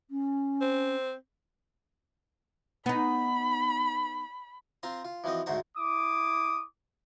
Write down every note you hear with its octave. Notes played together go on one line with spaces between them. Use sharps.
C#4
C4
B3 D#4 B5
C4 F4 A#5 C6
F4
E3 F3 C4 F#4 D#5
D2 G#2 A3 F#4 C5 F#5
E4 D6 D#6